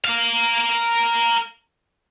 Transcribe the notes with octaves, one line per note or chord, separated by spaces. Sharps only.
A#4 F5